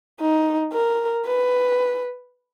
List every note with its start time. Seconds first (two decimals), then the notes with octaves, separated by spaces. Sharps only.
0.20 D#4
0.73 A#4
1.26 B4